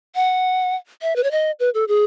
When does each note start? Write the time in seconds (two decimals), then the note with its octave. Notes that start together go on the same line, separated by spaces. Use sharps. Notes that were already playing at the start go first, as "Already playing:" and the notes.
0.15 F#5
1.02 E5
1.16 B4
1.23 C#5
1.31 D#5
1.60 B4
1.74 A4
1.88 G#4